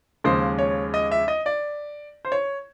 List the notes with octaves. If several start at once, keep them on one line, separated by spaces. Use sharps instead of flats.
D#2 C#3 F3 G#3 C5
C#5
D#5
E5
D#5
D5
C5
C#5